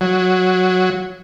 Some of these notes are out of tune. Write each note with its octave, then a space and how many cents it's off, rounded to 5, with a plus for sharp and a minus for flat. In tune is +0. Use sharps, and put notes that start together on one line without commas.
F#3 -10